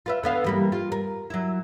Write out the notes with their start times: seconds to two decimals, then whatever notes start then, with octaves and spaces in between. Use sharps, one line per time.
0.06 F4 B4 E5
0.23 D3 B3 F5
0.44 E3 G3 A#3
0.72 F4
0.92 A#4
1.30 F#3 E4